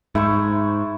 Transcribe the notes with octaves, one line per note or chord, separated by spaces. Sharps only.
G#2 E4 C5 C#6